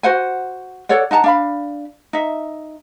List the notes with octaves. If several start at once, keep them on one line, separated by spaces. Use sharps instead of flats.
F#4 C5 F#5 G#5
A4 C#5 D5 F#5
D#4 F#5 A5 A#5
D4 F5 B5
D#4 E5